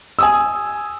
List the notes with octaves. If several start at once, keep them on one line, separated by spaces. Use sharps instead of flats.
G#5 D#6 E6